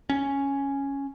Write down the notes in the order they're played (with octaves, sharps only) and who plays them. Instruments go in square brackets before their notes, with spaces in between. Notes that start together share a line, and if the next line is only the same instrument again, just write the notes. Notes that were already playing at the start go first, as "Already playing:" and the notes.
[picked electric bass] C#4